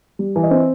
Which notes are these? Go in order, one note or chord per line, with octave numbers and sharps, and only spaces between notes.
G3
E3
D#5
C4